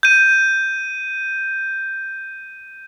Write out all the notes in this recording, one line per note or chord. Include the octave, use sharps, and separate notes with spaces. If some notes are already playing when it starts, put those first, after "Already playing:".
G6 D#7